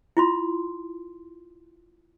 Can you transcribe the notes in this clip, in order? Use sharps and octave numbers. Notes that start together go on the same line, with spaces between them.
E4 F4 C6